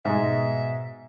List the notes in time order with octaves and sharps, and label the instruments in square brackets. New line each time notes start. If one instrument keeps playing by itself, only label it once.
[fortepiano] G#2 G#3 [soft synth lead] B2 [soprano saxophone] E5